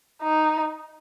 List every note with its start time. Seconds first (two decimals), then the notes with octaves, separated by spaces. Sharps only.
0.22 D#4